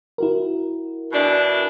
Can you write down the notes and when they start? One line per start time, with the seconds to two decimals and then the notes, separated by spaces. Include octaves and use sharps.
0.18 E4 F#4 A#4
1.13 B2 E3 D4